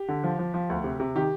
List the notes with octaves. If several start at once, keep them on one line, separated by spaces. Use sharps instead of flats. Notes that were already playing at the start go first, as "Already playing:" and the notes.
Already playing: G4
D3
F3
F3
F3
D2
C3
C3
D#3 G4